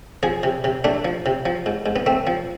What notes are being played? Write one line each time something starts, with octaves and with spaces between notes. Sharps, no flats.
F3 G#4
C3
C3
A3 D4
F3
C3
F3
G#2
G#2
B3
A3 C4
F3